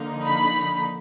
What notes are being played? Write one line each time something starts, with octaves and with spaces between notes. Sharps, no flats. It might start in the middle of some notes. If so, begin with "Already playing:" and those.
Already playing: D3 F3 A#3 D#4
B5